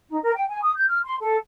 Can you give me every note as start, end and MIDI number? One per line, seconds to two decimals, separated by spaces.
0.08 0.18 63
0.24 0.31 70
0.36 0.46 79
0.49 0.61 80
0.63 0.72 87
0.76 0.85 91
0.89 0.99 89
1.04 1.16 84
1.20 1.35 69